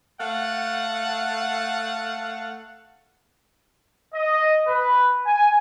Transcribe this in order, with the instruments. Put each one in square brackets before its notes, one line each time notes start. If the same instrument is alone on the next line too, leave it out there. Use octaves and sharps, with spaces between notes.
[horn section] A3 F5 F#5
[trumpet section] D#5
B4
G#5